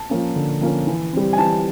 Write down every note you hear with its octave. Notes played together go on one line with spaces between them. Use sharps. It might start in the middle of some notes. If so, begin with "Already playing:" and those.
Already playing: A5
F3 A#3 C#4
D3
F3 A#3 C#4
E3
G3 C4
G#5
E3 A5